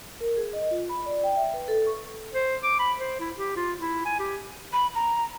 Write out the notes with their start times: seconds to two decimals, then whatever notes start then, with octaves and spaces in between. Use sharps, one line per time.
0.21 A#4
0.37 G#4
0.53 D#5
0.71 F4
0.89 B5
1.06 D5
1.24 G5
1.36 E5
1.54 B4
1.68 A4
1.87 C#6
2.34 C5
2.64 D6
2.79 B5
3.00 C5
3.20 E4
3.36 G4
3.56 F4
3.80 E4
4.06 G#5
4.19 G4
4.73 B5
4.95 A#5